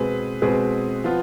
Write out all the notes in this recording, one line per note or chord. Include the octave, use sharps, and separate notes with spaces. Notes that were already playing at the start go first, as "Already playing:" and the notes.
Already playing: B2 G#3 C4 G#4 B4
B2 G#3 C4 G#4 B4
F3 B3 F4